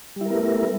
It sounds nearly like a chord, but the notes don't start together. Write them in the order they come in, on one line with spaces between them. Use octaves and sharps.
G3 E4 A#4 B3 A3